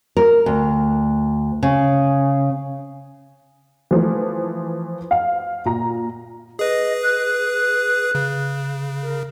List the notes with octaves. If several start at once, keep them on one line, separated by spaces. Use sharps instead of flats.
A#4
D2
C#3
E3 F3 A3
F5
A#2 A#5
G#4 B4 D#5
F#6
C#3
A#4